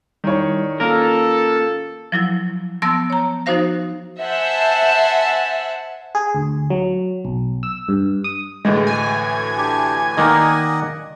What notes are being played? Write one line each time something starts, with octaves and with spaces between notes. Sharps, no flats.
D#3 G3 E4 C#5 D5
A#3 C#4 F4 A4 A#4
F3 F#3 E4
F3 B3 A5 C6 E6 A#6
C#5 A#5
F3 D#4 F#4 C5 F5 A#6
C5 E5 F#5 G#5 A5
G#4
D2
F#3
B1
E6
G2
D#6
D2 A2 E3 G#3
G#5
D4 G4
D#3 A#3 D5 D#5 F#5